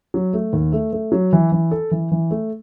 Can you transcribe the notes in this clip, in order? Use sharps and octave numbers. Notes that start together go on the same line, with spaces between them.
F#3
A3
D#2
A3
A3
F#3
E3
E3
A4
E3
E3
A3